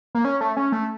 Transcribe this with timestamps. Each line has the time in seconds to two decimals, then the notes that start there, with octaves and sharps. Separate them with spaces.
0.15 A#3
0.25 C#4
0.41 A3
0.57 C#4
0.72 A3